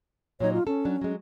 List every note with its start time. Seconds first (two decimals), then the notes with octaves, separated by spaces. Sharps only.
0.40 A#2 F#3 D#4 C#5
0.53 F4
0.67 C#4 A4
0.85 F#3 D4
1.01 F#3 G#3